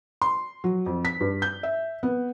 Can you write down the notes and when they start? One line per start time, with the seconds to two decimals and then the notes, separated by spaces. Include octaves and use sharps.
0.22 C6
0.64 F#3
0.86 F2
1.05 B6
1.20 G2
1.42 G6
1.63 E5
2.03 B3